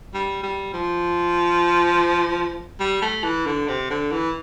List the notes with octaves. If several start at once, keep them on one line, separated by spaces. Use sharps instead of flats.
G3
G3
F3
G3
A3
E3
D3
C3
D3
E3